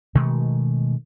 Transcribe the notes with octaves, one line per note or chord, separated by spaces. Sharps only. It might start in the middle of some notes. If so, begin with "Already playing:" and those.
B2 D#3 G#3 A3